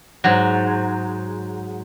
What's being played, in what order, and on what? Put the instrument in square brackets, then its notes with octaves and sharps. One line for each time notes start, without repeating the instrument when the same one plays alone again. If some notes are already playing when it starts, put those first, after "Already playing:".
[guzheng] G#2 F#3